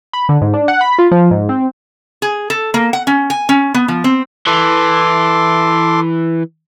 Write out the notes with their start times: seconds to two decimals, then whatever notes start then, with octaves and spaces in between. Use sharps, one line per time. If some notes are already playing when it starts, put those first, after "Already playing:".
0.13 B5
0.29 D3
0.41 G#2
0.54 D4
0.68 F#5
0.81 B5
0.99 F4
1.11 F3
1.31 G#2
1.49 C4
2.22 G#4
2.50 A4
2.74 A#3
2.93 F#5
3.07 C#4
3.30 G#5
3.49 C#4
3.74 B3
3.88 F3
4.04 C4
4.47 E3 A4 C6 D6